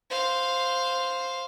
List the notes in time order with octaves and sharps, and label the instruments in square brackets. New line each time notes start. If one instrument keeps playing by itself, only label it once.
[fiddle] C5 F5